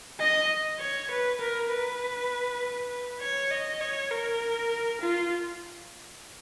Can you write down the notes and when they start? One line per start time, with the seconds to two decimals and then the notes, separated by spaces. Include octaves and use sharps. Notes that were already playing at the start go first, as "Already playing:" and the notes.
0.20 D#5
0.79 C#5
1.10 B4
1.41 A#4
1.70 B4
3.21 C#5
3.51 D#5
3.81 C#5
4.11 A#4
5.01 F4